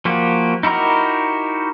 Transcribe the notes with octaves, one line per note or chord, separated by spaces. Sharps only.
F3 A#3 F#4 G4
D#4 E4 F#4 G4 A#4